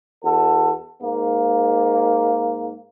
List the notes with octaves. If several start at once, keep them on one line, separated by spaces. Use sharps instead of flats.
E2 F#4 A4
G#2 A#3